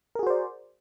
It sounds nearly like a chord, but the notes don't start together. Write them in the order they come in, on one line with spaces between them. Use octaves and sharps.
A#4 G#4 F#4 C5 D5